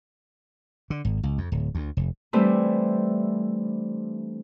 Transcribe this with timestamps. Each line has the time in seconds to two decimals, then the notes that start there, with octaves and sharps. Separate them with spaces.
0.90 D3
1.05 G#1
1.23 C#2
1.38 F2
1.52 D1
1.75 D2
1.97 F1
2.33 E3 G3 A3 C4 D4 E4